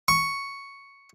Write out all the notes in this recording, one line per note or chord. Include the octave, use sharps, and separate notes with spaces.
C#6